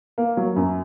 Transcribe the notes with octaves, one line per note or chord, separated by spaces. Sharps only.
A#3
F#3
F#2